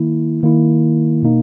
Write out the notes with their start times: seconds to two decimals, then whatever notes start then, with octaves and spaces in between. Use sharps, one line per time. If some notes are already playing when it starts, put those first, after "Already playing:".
Already playing: D#3 A#3 E4
0.43 D#3 A#3 E4
1.23 B2 A#3 D#4